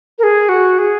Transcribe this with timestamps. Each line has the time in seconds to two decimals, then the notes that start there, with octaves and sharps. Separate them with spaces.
0.19 A#4
0.23 G#4
0.49 F#4
0.79 G#4